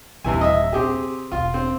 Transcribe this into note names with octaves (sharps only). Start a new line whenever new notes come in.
D#1 C3 E3 G#5
D#5 E5
C3 C4 G4 G#4
E1 F4
C4